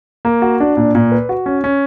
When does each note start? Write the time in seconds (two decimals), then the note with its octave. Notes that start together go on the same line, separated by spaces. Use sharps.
0.25 A#3
0.42 F#4
0.60 D4
0.77 A#2
0.95 A#2
1.12 B4
1.29 F#4
1.46 C#4
1.64 C#4